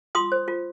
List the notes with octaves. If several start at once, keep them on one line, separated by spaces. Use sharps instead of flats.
F4 C6 D#6
C5
F4